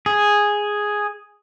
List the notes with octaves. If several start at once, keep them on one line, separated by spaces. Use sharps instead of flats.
G#4